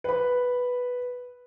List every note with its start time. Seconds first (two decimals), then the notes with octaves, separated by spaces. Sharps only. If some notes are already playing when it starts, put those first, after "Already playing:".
0.04 B4 B5